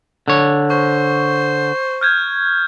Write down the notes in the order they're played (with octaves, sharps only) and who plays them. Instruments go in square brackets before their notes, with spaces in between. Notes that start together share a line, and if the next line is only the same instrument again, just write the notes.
[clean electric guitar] D3 C#5
[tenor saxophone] C5 [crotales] C#6
[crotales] F6 G6 G#6